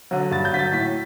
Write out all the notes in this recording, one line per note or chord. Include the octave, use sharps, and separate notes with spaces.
D3 F#3
G2 A6
G6
D3 F#3 A6 B6
A2 B6